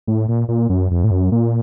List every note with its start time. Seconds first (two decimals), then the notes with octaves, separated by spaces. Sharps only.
0.07 A2
0.28 A#2
0.48 A#2
0.69 F#2
0.91 F2
1.04 A2
1.11 F#2
1.32 A#2